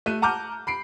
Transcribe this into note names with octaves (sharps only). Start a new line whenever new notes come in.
A3 F#6 D#7
F#5 A5 A#5 D6 F6 G6
B5 C7 D7